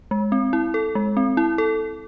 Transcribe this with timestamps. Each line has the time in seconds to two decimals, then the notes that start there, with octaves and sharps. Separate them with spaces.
0.11 G#3
0.32 C4
0.53 E4
0.74 A4
0.95 G#3
1.17 C4
1.37 E4
1.58 A4